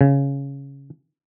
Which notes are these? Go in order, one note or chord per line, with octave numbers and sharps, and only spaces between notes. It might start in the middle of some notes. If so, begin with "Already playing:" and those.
C#3